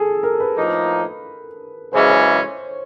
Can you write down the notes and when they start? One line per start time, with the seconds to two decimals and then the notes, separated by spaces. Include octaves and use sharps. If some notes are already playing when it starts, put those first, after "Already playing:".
Already playing: G#4 A4
0.23 A#4
0.40 B4
0.57 A2 F3 A#3 D#4
1.93 F#2 C#3 E3 G#3 C#4 C5
2.10 C#5